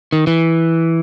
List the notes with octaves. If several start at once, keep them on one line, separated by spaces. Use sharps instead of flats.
D#3
E3